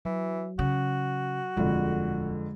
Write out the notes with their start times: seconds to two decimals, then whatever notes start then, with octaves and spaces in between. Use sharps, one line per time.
0.05 E3 F#3
0.59 C#3 F#4
1.57 D#1 F2 D3 G#3